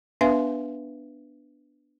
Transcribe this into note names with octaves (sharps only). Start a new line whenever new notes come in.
B3 D4 B4 E5 F5 G#5